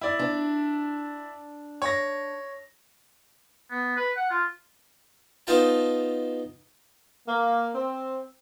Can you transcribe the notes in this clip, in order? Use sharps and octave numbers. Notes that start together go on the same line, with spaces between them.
E4 D5
D4
C#5 A#6
B3
B4
F#5
F4
B3 D#4 F4 G5 A5
A#3
C4